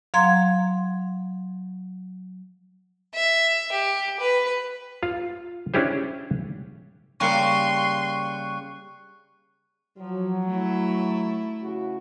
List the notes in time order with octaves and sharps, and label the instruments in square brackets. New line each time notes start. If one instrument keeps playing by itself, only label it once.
[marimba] F#3 F5 A#5 C6 G#6
[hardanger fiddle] E5
G4
B4
[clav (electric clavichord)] F4 F5
C#4 D4 E4 G4 G#4 C5
[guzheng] C#3 G3 A#3 [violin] C6 [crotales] C#6 F#6 C#7
[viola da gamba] F3 [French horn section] F#3
[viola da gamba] A3 E4
[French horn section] C#3 E4 F#4